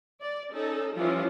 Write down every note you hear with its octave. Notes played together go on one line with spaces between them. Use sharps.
D5
C#4 D#4 A4
E3 F3 G3 C#4 E4 F4